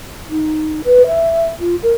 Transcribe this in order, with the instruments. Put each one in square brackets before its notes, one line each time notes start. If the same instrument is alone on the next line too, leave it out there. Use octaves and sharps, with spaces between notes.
[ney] D#4
B4
E5
F4
A#4